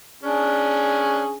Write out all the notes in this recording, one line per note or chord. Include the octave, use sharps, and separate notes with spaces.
C#4 D4 G#4